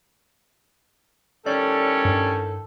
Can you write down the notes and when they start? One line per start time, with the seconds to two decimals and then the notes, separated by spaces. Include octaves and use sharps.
1.46 A2 D#3 G3 C#4 A4 D5
2.05 G2